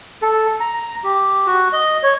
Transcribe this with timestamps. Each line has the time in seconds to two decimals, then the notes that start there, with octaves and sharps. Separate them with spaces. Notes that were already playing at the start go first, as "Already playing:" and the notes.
0.22 A4
0.60 A#5
1.04 G4
1.47 F#4
1.73 D#5
2.03 C#5